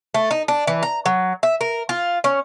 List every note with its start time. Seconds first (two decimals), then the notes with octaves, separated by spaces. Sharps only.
0.14 A3
0.31 D#4
0.48 D4
0.67 E3
0.83 A#5
1.06 F#3
1.43 E5
1.61 A#4
1.89 F4
2.24 C#4